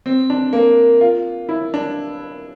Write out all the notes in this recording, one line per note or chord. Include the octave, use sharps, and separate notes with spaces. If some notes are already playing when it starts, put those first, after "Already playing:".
C4
D4
A#3
F4
E4
D4